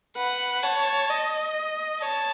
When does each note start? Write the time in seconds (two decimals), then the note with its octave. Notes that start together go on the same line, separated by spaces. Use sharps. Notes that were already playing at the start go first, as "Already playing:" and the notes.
0.16 B4 F#5
0.63 C#5 A5
1.09 D#5
2.01 C#5 A5